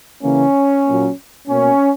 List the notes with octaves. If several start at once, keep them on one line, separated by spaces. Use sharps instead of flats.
C#3 E3 A#3 C#4
A#2 F#3 A#3
B2 A#3 C#4